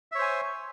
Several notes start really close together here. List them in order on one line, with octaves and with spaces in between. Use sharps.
E5 C#5 C5 G#5